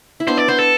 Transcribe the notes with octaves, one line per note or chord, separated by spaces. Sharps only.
E4
B3 D4 C5
D5
B3 D4 C5
A4